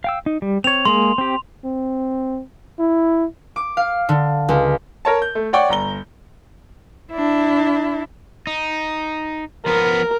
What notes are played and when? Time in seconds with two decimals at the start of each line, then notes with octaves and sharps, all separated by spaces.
0.04 F5 G5 E6
0.26 D#4
0.42 G3
0.64 C4 C#5 F7
0.85 G#3 A#3 G#4 C6
1.18 C4 G4
1.64 C4
2.79 E4
3.56 D6
3.77 F5
4.09 D3
4.49 C#2
5.05 A#4 C#5 A5
5.22 G6
5.35 A3
5.53 C#5 D5 F#5 G5 C#6
5.69 G1 A#5 G7
7.12 D4 E4
8.47 D#4
9.66 F3 B3 A#4